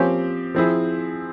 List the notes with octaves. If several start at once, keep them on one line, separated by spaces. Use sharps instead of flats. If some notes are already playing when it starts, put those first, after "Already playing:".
Already playing: F3 A#3 C4 C#4 G4
F3 C4 E4 G#4